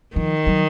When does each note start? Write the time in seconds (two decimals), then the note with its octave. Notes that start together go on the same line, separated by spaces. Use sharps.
0.16 D#3 F3
0.47 F#3